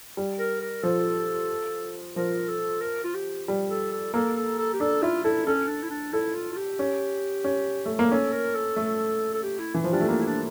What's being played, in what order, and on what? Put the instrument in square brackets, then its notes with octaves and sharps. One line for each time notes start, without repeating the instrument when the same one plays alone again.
[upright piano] G3
[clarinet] A#4
A#4
[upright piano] F3 [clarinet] A4
[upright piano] F3 [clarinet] A#4
[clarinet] A4
A#4
F4
G4
[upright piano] G3
[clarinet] A4
A4
[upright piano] A#3 [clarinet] A4
[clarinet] A4
A4
G4
[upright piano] D4 [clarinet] A4
[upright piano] E4 [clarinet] F4
[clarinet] E4 [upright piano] A4
[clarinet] C#4 [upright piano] A4
[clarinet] D4
E4
D4
[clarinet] E4 [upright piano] A4
[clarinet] F4
F4
G4
[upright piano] C#4
C#4
A3
A#3
[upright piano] C#4 [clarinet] A4
[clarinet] A#4
A4
[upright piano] A3
[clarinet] A4
G4
E4
[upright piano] E3
F3
[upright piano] G3 [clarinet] D4
[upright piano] A3
[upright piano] A#3 [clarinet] D4
[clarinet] E4
D4